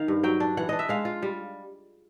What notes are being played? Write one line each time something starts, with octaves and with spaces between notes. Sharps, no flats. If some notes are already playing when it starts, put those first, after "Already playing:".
Already playing: D#3 F5
G2
F#3 G5
D4
E3 F#5
D4 D#5
E5
G#3 F5
F4
G3